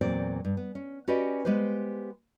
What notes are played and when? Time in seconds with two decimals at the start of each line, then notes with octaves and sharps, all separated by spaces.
0.01 E2 A#2 F#3 C4 C5 D5
0.45 G2
0.57 B3
0.75 C#4
1.08 C#4 F#4 G4 B4 D5 D#5
1.45 G#3 B3 G4 B4 C5